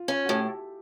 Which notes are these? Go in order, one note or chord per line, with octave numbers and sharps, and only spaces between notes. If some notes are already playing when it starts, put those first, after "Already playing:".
Already playing: F4
C#4
F#4
A2 G4